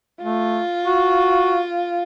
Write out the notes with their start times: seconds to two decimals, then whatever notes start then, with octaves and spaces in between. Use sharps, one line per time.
0.23 A3 F4
0.86 F#4